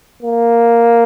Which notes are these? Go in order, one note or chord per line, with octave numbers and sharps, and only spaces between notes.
A#3